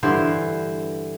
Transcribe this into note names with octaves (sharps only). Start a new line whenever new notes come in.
G2 D3 E3 C5